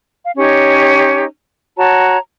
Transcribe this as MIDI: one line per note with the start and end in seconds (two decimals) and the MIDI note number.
0.25 0.32 77
0.36 1.25 61
0.36 1.25 63
0.36 1.25 67
0.36 1.25 73
1.77 2.18 66
1.77 2.18 73
1.77 2.18 81
1.77 2.18 82